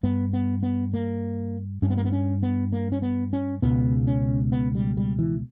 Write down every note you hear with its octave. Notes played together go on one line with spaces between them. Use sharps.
G2 B3
B3
B3
A#3
G2 C#4
B3
A#3
B3
C#4
B3
A#3
C#4
B3
C#4
C#2 B2 B3
C#4
B3
G3
G3
E3